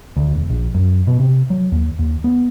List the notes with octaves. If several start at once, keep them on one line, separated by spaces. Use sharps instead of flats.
D2
E1
A#1
F#2
B2
C3
F#3
D#2
D#2
B3